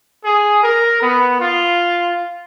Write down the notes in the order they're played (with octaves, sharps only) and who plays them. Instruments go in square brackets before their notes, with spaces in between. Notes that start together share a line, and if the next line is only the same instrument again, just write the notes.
[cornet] G#4
A#4
B3
F4